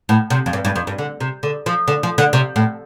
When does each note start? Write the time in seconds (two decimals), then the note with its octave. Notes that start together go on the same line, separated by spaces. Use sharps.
0.09 A2
0.30 C3
0.46 F2
0.53 G2
0.65 G2
0.76 F2
0.87 G2
0.98 D3
1.20 C3
1.43 D3
1.66 F3
1.88 D3
2.03 F3
2.18 D3
2.33 C3
2.56 A2